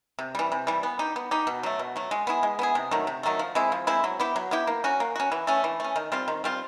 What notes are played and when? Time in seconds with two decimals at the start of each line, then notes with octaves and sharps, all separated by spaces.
0.19 C3
0.35 E3 G3
0.52 C3
0.67 E3 G3
0.83 B3
0.99 D#4 G4
1.16 B3
1.31 D#4 G4
1.47 B2
1.63 F#3 A3
1.79 B2
1.96 F#3 A3
2.11 G#3
2.27 B3 E4 G#4
2.43 G#3
2.59 B3 E4 G#4
2.75 C3
2.91 D#3 F#3 A3
3.07 C3
3.23 D#3 F#3 A3
3.39 F3
3.55 G#3 C4 E4
3.72 F3
3.87 G#3 C4 E4
4.04 F#3
4.20 B3 E4 G4
4.36 F#3
4.51 B3 E4 G4
4.67 A#3
4.84 C#4 F#4
5.00 A#3
5.16 C#4 F#4
5.32 E3
5.47 A3 C#4
5.64 E3
5.80 A3 C#4
5.96 D#3
6.12 G3 C4 F4
6.28 D#3
6.44 G3 C4 F4